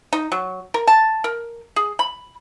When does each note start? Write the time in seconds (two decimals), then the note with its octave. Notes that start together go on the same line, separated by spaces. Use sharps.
0.13 D#4
0.32 F#3
0.74 A#4
0.87 A5
1.24 A#4
1.76 G#4
1.99 B5